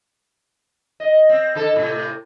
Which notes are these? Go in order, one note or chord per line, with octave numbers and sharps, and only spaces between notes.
D#5
C4
D3 A4
A2 C3